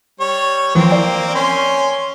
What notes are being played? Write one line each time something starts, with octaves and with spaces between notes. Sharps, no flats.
G3 C#5
E3 F3 A#3 C4
D5 G5
C#4 C6